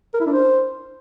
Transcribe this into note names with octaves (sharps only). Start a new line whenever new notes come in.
A#4
E4
D4
C5